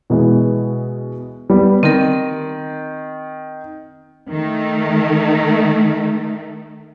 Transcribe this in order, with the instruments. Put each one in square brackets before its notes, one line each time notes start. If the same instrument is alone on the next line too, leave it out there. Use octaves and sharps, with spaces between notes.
[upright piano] B2 E3 G#3
G3 B3
[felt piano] D#3 [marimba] C4 A#4
[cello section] D#3 A3